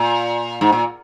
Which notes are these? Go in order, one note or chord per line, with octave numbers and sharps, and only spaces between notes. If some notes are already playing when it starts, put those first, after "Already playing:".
Already playing: A#2
G#2
A#2